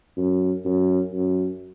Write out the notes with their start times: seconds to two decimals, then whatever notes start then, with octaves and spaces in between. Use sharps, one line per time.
0.17 F#2
0.65 F#2
1.12 F#2